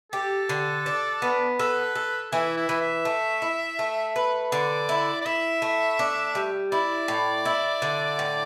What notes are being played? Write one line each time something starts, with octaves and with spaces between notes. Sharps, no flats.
G4 A4
D3
D4
B3
A4 B4
A4
E3 E4
E4
E3
E5
A3
E4
A3
B4
D3 D5
E4
D5
E4 E5
A3
D4
G3
E4 D5
A2
E4
D3
A2